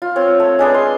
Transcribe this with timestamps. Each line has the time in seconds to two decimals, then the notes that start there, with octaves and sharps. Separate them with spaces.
0.02 F4
0.16 C4 C#5
0.40 A3
0.59 G#3 D4 G#4 B4
0.74 C6